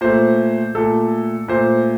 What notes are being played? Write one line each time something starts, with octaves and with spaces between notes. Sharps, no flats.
A#2 A3 C5
A#2 A3 A4
A#2 A3 C5